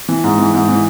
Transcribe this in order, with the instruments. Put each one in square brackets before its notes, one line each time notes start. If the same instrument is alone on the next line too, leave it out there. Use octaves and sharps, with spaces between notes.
[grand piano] E3
G#2
E3
G#2
E3